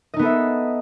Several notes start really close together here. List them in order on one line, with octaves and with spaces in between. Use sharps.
D#5 D#4 B3 A4 E5